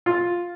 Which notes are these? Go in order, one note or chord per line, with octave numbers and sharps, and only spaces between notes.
F4